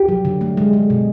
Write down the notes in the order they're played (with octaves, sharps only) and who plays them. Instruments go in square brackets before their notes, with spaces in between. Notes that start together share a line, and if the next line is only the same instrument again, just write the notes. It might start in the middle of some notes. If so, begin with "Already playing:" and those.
Already playing: [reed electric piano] G4
[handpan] F#3
D3
A3
G#3
G#3
B2